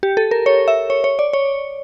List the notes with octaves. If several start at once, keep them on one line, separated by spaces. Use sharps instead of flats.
G4
A4
A#4
C#5
E5
C#5
C#5
D5
C#5